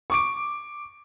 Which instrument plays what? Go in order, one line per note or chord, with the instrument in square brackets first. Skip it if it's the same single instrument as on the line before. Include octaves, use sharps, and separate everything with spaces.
[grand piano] C#6 D6 D7